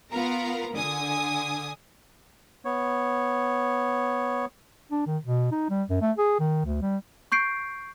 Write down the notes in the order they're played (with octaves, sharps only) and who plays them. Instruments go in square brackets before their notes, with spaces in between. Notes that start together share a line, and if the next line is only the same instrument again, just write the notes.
[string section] B3 F4 A#4 F5 A#5
D3 G#5 D#6
[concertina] B3 C#5
[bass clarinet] D4
D#3
B2
D#4
G3
F#2
A3
G#4
D#3
D2
G3
[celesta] C#6 G6 C7 D7